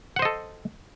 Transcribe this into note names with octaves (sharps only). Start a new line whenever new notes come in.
A4 C5 D#5 F#5